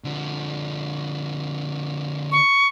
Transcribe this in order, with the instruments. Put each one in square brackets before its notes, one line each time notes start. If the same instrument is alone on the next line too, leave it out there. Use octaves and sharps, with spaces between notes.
[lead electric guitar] D3 F3
[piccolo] C#6